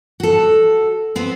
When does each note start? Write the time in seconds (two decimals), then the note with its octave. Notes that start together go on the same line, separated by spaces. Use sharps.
0.20 F#4 A4
1.15 B3 C4